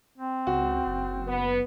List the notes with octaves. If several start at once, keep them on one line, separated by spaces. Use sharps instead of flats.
C4
C#2 F#4
F#1
B3